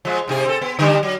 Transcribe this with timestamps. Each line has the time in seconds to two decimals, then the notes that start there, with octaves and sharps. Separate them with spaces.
0.05 F3 G#3
0.28 G#2 C3 G#4
0.46 C4 A4
0.61 B3
0.79 D3 G3 D4
1.03 F#3